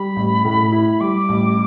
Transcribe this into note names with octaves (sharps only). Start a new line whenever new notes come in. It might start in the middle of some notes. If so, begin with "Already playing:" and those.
Already playing: G3 B5
A1
A2
E4
G3 D6
A1